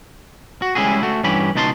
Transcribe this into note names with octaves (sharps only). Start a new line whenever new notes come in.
F#4
G3 G#3 C#4 E4 F#4 G#4
A3 F#4
G2 E3 C#4 G4 B5
C#2 B2 D#4 A5 B5 C6